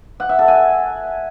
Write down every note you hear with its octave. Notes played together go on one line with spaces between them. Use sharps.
F#5
E5
A4
G#5